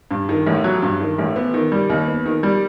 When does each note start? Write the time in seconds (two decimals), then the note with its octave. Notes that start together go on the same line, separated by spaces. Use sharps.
0.11 G2
0.29 D#3
0.47 A1
0.64 F#3
0.82 G2
1.00 D#3
1.18 A1
1.36 B3
1.54 D#3
1.72 G3
1.90 D#2
2.08 B3
2.26 D#3
2.43 G3